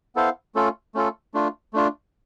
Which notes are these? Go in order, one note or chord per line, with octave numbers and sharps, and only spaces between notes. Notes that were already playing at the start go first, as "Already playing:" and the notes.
B3 E4 A4 C5 F5
A3 C#4 F4 A4
A3 C#4 F4 A4
A3 D4 F4
A3 D4 F4